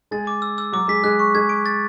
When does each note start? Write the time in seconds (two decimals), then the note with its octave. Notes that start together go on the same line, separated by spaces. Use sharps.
0.11 G#3 G#4 A6
0.27 D6
0.42 E6
0.58 E6
0.73 F#3 F#4 D6
0.88 G#3 G#4 B6
1.03 G#3 G#4 F#6
1.19 C#6
1.35 G#3 G#4 G#6
1.49 D7
1.66 A6